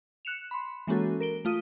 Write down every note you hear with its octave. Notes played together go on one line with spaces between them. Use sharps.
F#6 C#7 E7 F7
B5 C6
E3 G#3 A#3 C#4 F#4 A4
A#4 D7 G7
A3 F4 D#6 D#7